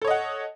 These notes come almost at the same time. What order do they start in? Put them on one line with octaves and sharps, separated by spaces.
A4 C#5 D#5 F#5